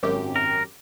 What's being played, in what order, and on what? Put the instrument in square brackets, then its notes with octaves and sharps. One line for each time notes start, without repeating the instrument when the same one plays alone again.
[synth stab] G#1 F#2 G4
[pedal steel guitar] A#4